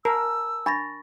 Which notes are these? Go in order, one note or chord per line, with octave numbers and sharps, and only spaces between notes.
A#4 G#5 A5 E6
D4 B5 C#6 A6 A#6